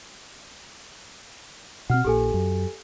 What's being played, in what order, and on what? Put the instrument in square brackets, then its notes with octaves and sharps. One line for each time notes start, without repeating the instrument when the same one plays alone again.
[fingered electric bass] B2 C4 [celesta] F#5 F6
[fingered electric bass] A#1 A#2 [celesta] G4 A4 G#5
[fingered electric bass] F#2